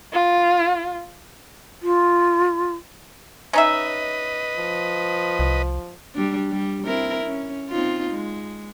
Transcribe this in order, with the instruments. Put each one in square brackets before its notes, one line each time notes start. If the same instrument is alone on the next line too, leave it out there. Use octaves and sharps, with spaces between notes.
[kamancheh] F4
[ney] F4
[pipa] C#4 D#4 E5 [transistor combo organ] B4 D#5
[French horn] F3
[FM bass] C2
[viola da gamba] G3 D4
G3
C4 E4 A#4
C#4
C4 D#4 F4
G#3